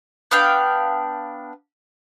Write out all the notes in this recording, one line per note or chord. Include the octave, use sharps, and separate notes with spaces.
B3 D4 F5 G5